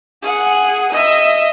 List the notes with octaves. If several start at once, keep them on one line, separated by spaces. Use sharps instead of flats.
G#4 F#5
D#5 E5